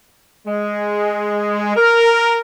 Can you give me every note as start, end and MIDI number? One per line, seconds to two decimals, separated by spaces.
0.47 1.73 56
1.76 2.39 70